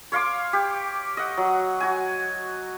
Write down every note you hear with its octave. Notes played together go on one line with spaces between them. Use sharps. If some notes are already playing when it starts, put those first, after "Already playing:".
C#5 F5 C6 D6
G4
D#5 F#5
F#3
F#4 G#5